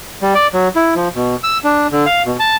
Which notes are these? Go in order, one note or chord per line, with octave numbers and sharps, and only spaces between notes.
G3
D5
F#3
E4
F3
B2
E6
D4
D3
F5
B2
A5